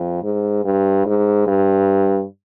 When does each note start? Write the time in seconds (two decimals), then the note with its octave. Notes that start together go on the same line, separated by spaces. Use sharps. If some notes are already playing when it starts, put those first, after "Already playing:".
Already playing: F2
0.23 G#2
0.65 G2
1.06 G#2
1.47 G2